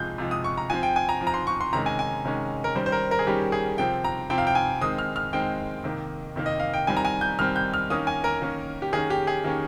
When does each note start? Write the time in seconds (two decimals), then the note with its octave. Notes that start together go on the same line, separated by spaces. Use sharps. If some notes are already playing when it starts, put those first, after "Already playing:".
Already playing: C3 F3 G#3 G6
0.18 C3 F3 G#3
0.31 D#6
0.44 C#6
0.57 A#5
0.70 F3 C4 G#5
0.83 G5
0.96 G#5
1.09 A#5
1.21 F3 C4
1.27 A#5
1.34 C6
1.47 C#6
1.61 C6
1.73 C3 D#3 G#3 C#4 A#5
1.86 G#5
1.99 G#5
2.25 C3 D#3 G#3 C#4
2.64 A#4
2.75 D#3 G3 C#4 C5
2.86 C5
2.92 A#4
3.11 A#4
3.19 G#4
3.27 D#3 G3 C#4 G4
3.52 G#4
3.78 C3 F3 C4 G5
4.04 A#5
4.30 C3 F3 C4 G5
4.38 F5
4.47 G5
4.55 G#5
4.81 D#3 G#3 C4 D#6
4.98 F6
5.16 F6
5.33 D#3 G#3 C4 G5
5.84 C3 D#3 A#3
6.36 C3 D#3 A#3
6.46 D#5
6.60 F5
6.74 G5
6.87 D#3 G3 C4 G#5
6.97 A#5
7.05 G#5
7.21 G6
7.39 D#3 G3 C4 F6
7.56 G6
7.74 F6
7.90 D#3 A#3 C#4 D#6
8.07 G#5
8.24 A#4
8.42 D#3 A#3 C#4
8.82 G4
8.93 D#3 A#3 C#4 G#4
9.10 G4
9.27 G#4
9.44 D#3 A#3 C#4